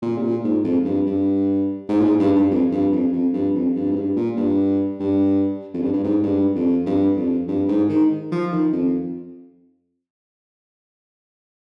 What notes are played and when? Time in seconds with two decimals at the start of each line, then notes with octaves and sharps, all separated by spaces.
0.02 A#2
0.18 C3
0.23 A#2
0.44 G#2
0.64 F2
0.85 G2
1.06 G2
1.89 G#2
2.00 A#2
2.04 G#2
2.20 G2
2.36 G2
2.51 F2
2.72 G2
2.93 F2
3.13 F2
3.34 G2
3.55 F2
3.76 G2
3.91 G#2
3.96 G2
4.16 A#2
4.37 G2
5.00 G2
5.74 F2
5.82 G2
5.94 G2
6.04 G#2
6.24 G2
6.56 F2
6.86 G2
7.17 F2
7.48 G2
7.68 G#2
7.89 D#3
8.32 F3
8.52 D#3
8.73 F2